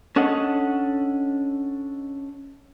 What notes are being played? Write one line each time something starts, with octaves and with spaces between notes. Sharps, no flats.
C#4 D4 A4 D#5 F#5